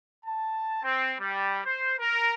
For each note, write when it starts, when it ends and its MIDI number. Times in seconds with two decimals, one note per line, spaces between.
0.25 0.81 81
0.82 1.13 60
1.19 1.59 55
1.65 1.93 72
1.99 2.34 70